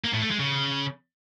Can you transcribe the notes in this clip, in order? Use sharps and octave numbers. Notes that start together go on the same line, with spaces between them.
A#3
A2
A3
G#3
C#3